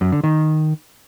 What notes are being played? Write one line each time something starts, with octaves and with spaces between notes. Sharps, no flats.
F#2
D3
D#3